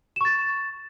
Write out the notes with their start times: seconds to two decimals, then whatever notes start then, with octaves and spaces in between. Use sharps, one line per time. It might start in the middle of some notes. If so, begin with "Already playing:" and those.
0.16 E7
0.21 C#6
0.25 A6